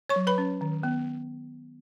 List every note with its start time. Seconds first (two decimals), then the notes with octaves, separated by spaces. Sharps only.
0.09 C#5 C#6
0.16 F#3
0.27 B4 B5
0.38 C#4
0.61 D#3
0.83 B3